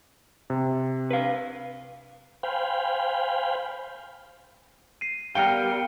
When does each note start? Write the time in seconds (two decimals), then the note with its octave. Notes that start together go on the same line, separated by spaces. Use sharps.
0.50 C3
1.11 B4 F5
2.43 C5 F5 G5 G#5 B5
5.01 C7 D#7
5.35 G3 B3 A#4 F5 G5 F6 C#7 G7